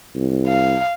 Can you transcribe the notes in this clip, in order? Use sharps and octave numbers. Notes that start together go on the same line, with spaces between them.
C2
F5